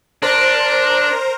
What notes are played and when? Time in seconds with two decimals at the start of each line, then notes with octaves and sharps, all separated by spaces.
0.22 D4 A#4 C5 A#5